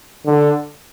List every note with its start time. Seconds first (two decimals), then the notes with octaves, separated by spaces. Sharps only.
0.26 D3